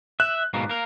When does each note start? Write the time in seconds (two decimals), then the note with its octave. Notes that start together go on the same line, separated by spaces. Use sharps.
0.20 E5 F#6
0.54 G#2 B2 A#3
0.69 A#3 A#4